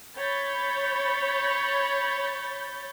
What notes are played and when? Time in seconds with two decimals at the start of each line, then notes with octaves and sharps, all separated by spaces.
0.16 C#5 B5 G6 A6